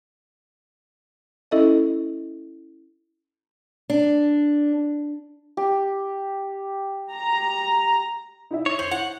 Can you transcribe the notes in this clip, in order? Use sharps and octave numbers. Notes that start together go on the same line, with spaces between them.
C#4 E4 A4 D#5 E5
D4
G4
A#5
D#4 E4 E5
C#5
C5 F#7
E4 F#5